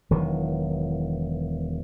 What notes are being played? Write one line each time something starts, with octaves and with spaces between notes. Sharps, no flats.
E1 D#3 E3 F#3